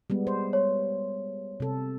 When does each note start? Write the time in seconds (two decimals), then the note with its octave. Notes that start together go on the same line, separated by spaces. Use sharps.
0.10 G3 G#3 B3
0.27 C5
0.53 C#5
1.60 C3 A4